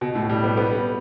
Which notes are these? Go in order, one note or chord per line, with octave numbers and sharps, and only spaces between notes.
B2
A2
G3
B3
B3